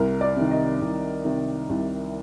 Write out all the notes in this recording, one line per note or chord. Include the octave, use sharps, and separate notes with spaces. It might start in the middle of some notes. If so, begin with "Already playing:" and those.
Already playing: C2 A#4
D5
C3 D#3
D#5
C2
C3 D#3
C2